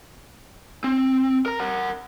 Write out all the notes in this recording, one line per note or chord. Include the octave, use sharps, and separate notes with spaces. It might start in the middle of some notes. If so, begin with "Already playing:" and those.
C4
A#4 A#5
A#4 F#5